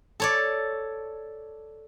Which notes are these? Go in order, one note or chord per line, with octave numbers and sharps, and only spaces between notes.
A4 C#5 D5